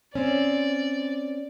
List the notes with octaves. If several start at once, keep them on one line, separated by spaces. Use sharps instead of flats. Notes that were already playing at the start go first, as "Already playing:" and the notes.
C4 C#4 D5